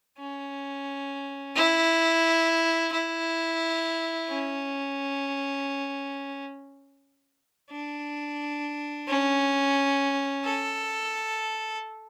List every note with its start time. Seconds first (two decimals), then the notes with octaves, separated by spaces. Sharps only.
0.19 C#4
1.56 E4
2.92 E4
4.29 C#4
7.71 D4
9.08 C#4
10.45 A4